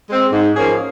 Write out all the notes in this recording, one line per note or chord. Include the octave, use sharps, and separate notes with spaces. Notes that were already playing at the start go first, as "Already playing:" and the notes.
G#3 C4
G#2
F3 A#3 C#4 G#4